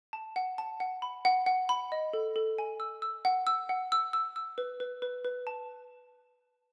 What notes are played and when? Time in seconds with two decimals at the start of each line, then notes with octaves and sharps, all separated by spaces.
0.13 A5
0.36 F#5
0.58 A5
0.80 F#5
1.02 B5
1.25 F#5
1.46 F#5
1.69 B5
1.92 D#5
2.13 A4
2.36 A4
2.59 G#5
2.80 E6
3.02 E6
3.25 F#5
3.47 E6
3.69 F#5
3.92 E6
4.13 E6
4.36 E6
4.58 B4
4.80 B4
5.02 B4
5.24 B4
5.47 A5